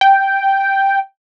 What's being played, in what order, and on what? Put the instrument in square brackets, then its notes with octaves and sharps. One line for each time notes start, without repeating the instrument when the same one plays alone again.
[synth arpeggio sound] G5